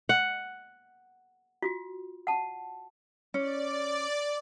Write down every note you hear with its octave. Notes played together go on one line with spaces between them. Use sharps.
F#5
F4 F#4
F#5 A5
C#4 D5